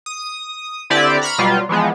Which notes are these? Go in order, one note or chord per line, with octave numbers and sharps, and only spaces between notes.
D#6
D3 C4 E4 G4 B4 D5
A#5 B5 C#6 F6
B2 F#3 G3 F4
E3 F3 G#3 B3